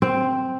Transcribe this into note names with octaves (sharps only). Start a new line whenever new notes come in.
C4